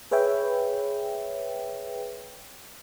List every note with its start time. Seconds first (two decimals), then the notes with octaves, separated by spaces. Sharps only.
0.11 G#4 B4 C#5 E5 G5